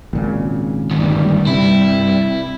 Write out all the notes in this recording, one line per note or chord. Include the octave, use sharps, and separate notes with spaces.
G#1 A#2 C#3
D2 G2 D#3 G3
C3 E4